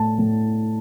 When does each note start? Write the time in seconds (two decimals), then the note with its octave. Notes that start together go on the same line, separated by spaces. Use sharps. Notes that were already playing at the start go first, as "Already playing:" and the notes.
Already playing: A2 A5
0.18 A2